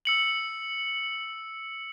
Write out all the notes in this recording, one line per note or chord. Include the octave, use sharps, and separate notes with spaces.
E6 C#7 F#7